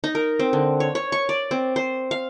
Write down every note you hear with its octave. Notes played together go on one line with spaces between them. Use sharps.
D#4
A#4
C4
D3
C#5
C#5
C#6
D5
C4
C5
F5